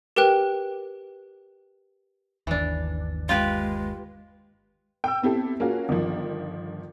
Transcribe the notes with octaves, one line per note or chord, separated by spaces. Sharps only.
G4 A#4 B4 G5 F#6
G1 D#2 E3 D4
G#3 F4 G4 B4
G5 E6
B3 C4 E4 G4 A4
A#3 C#4 F4 F#4 G#4
G1 D#3 F3